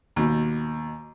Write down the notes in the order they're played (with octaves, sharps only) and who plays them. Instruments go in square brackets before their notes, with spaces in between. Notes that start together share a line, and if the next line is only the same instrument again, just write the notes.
[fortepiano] D#2 B2